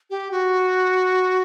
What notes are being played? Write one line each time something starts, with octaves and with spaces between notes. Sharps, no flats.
G4
F#4